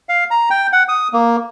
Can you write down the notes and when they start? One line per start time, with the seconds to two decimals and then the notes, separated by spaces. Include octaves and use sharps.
0.09 F5
0.31 A#5
0.50 G5
0.73 F#5
0.88 D#6
1.13 A#3